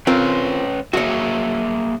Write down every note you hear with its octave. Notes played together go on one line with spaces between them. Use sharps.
C4 C#4 F4 A#4 B4 C#5
A#3 F#4 G#4 C#5 E5